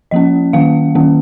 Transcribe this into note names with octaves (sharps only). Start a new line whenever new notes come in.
F3 A#3 C#4 D#5
D#3 A#3 C#4 F5
D#3 A#3 C#4